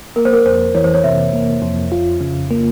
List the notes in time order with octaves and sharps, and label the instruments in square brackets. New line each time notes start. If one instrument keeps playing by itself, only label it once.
[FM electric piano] A#3 [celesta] A#4
[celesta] C5
A#4
[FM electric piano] F2 [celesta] C5
[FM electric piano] E3 [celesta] C#5
[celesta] C5
C#5
[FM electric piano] C3 [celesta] E5
[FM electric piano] A#3
F2
F4
C#3
A#3